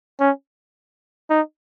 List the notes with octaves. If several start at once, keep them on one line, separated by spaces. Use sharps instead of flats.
C#4
D#4